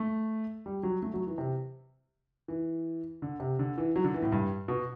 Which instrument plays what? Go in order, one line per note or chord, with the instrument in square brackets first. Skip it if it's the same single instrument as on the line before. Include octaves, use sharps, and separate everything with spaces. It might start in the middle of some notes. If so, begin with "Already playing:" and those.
Already playing: [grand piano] A3
G3
F#3
A3
F#3
E3
C3
E3
D3
C3
D3
E3
F#3
D3
E3
A2
G2
B2